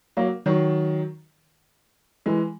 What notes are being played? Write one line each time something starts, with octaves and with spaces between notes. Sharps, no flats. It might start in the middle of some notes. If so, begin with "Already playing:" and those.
F#3 A#3
D#3 F#3
E3 G#3